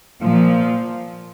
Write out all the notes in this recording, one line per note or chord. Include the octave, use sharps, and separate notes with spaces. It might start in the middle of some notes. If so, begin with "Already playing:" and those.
A#2 F3